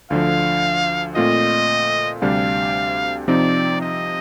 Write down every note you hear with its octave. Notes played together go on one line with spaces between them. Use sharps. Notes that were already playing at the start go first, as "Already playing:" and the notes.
D2 D3 F3 F5
A#2 A3 C4 F4 D#5
D2 C3 G3 D4 G4 F5
C3 F3 C4 D#4 D5
D#5